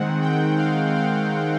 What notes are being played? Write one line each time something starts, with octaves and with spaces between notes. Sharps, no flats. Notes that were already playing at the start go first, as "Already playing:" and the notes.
Already playing: D#3 G#3 C4 F#5
G5
F5
F5